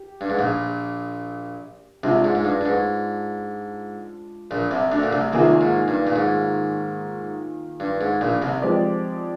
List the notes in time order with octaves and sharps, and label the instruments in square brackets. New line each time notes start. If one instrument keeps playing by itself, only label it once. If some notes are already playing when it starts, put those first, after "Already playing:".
Already playing: [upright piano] G4
[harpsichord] G2
G#2
A#1 A#2
[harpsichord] C2 C3 [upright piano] G#3 D4 F4
[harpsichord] G#2
G#2
G2
G2
G#2
A#1 A#2
C2 C3
D2 D3
A#2
C2 C3
[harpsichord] C2 C3 [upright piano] D#3 A#3 F4 G#4
[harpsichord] G#2
G2
A#2
G#2
G2
G#2
A#1 A#2
C2 C3
[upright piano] F3 G#3 C4 G4 D5